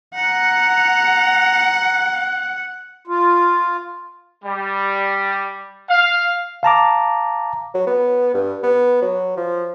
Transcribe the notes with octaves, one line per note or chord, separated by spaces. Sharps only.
F#5 A#5 F#6
F4
G3
F5
F5 A5 A#5 D6
F#3
B3
G2
B3
F#3
F3